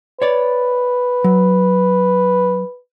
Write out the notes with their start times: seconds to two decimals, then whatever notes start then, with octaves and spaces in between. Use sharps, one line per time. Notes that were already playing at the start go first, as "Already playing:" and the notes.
0.22 B4 C#5 D5
1.24 F#3